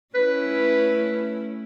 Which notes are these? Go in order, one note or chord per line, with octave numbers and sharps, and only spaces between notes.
A3 C#4 E4 B4